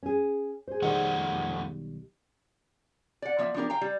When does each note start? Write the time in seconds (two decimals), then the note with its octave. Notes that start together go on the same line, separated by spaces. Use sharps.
0.03 C#4 G#4
0.68 G#4 C5
0.82 B1 F2 D#3 G3 A3 F#5
3.22 D5 F#5
3.39 F3 A#3 D5 E5
3.54 F3 B3 D4 G4 A#4
3.70 F5 G5 A#5
3.81 G3